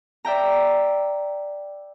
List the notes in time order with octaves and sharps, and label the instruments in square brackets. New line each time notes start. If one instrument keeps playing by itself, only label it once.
[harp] D5 E5 G5 A#5